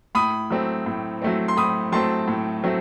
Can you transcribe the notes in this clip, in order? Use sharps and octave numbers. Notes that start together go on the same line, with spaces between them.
A2 B5 D#6
F#3 A3 C4
A2
F#3 A3 C4
C6
A2 B5 D#6
F#3 A3 C4 A5 C6
A2
F#3 A3 C4